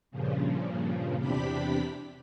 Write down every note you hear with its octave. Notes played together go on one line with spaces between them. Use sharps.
G2 A#2 C#3 F3
E2 C3 D4 G4 B5 B6